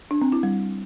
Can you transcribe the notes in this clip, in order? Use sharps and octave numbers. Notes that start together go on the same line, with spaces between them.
D4
C4
E4
G3